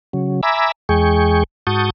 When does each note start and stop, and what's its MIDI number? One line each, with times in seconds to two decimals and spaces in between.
0.13 0.41 49
0.13 0.41 54
0.43 0.72 76
0.43 0.72 80
0.43 0.72 82
0.43 0.72 83
0.43 0.72 86
0.43 0.72 88
0.89 1.43 40
0.89 1.43 56
0.89 1.43 68
0.89 1.43 79
0.89 1.43 85
1.67 1.90 44
1.67 1.90 66
1.67 1.90 81
1.67 1.90 85
1.67 1.90 87
1.67 1.90 91